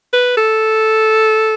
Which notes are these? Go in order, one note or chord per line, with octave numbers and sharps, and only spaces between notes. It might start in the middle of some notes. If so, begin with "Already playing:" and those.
B4
A4